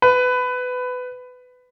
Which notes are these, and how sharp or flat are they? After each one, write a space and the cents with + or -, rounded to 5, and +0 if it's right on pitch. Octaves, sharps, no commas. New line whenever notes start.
B4 +20